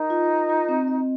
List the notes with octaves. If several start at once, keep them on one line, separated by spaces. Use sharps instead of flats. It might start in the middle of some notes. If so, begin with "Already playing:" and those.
Already playing: D#4 A#4
F4
F4
F4
C4
D#5